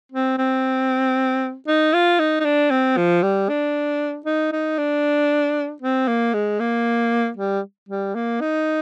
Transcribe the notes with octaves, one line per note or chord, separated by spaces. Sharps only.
C4
C4
D#4
F4
D#4
D#4
D4
C4
F3
G3
D4
D#4
D#4
D4
C4
A#3
G#3
A#3
G3
G3
A#3
D#4